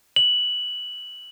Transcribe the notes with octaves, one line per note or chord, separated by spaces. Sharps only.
F#7